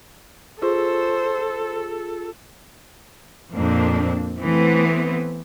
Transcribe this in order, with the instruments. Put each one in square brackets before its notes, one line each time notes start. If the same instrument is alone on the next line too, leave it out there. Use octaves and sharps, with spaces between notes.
[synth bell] F4 G#4 [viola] A4 [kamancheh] C5
[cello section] F2 A#2 A#3 C4 D4
E3 A3 B3 C4